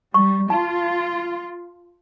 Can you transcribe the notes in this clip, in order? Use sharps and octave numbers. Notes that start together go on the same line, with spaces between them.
G3 C#6
F4 A5